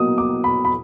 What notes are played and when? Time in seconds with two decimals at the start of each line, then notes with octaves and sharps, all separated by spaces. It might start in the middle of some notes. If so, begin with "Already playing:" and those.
Already playing: B2 F#3 A#3 D#6
0.18 D6
0.44 B5
0.65 B5